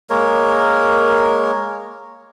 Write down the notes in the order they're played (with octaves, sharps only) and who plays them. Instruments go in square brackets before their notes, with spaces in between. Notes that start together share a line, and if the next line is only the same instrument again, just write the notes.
[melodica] G#3 A#3 A#4 C#5